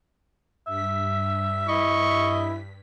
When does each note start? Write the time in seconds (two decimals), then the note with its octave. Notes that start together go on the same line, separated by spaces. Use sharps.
0.67 G2 E5 B6
1.68 E4 D#5 C#6